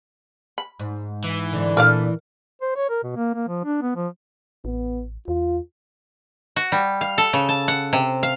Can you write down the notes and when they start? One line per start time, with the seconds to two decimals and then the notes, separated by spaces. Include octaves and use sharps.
0.58 B5
0.80 G#2
1.24 E3
1.53 G#2 D3
1.77 A#2 D4 A4 A#4 D5 F5
2.62 C5
2.76 C#5
2.90 A#4
3.04 B2
3.16 A#3
3.35 A#3
3.48 F3
3.65 D4
3.82 B3
3.96 F3
4.65 A1 B3
5.28 E2 F4
6.56 F#4
6.72 G3
7.01 F5
7.18 A4
7.33 C#3
7.49 A5
7.68 F#5
7.93 C3
8.23 F5